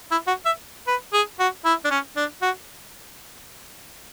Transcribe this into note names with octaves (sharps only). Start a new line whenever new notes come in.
E4
F#4
E5
B4
G#4
F#4
E4
D4
C#4
D4
F#4